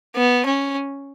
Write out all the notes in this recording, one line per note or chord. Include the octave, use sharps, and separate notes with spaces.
B3
C#4